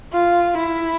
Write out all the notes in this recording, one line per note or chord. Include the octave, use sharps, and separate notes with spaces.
F4
E4